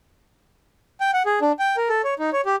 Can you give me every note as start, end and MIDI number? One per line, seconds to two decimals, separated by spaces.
1.01 1.11 79
1.14 1.23 78
1.26 1.39 68
1.41 1.52 62
1.59 1.76 79
1.77 1.89 70
1.89 2.02 69
2.04 2.14 73
2.19 2.30 63
2.33 2.41 73
2.46 2.56 67